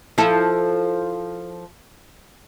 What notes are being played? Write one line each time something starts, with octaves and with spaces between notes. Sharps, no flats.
F3 E4 A4